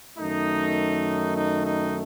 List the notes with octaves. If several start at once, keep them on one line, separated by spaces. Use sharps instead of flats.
F#2 D#3 A3 D#4
D#4
D#4